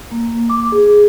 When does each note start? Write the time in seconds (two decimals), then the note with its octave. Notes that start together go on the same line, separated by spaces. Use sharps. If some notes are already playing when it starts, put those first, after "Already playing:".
0.11 A#3
0.50 D6
0.72 G#4